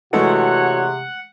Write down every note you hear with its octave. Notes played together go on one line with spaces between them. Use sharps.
C3 E3 G#3 A3 D4 F#4 C#5 F#5